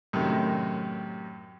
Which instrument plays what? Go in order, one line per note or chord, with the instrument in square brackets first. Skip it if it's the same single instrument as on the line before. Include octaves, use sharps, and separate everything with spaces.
[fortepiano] F#2 A2 C3 D#3